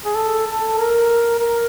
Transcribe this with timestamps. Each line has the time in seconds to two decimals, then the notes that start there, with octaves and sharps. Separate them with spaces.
0.05 G#4
0.15 A4
0.46 A4
0.77 A#4
1.39 A#4